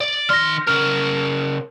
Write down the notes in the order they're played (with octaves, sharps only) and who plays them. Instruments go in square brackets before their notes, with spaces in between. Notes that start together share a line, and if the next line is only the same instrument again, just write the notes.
[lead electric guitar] D5
[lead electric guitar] D#3 C6 [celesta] F6 A#6
[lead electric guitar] C#3 A#4 [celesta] F6